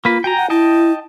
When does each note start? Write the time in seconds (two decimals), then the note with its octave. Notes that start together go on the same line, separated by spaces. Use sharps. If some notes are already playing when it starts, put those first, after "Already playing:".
0.05 A#3 F4 B4
0.24 F#4 G5 G#5 A#5
0.37 F#5
0.50 E4 D#5 G5 A5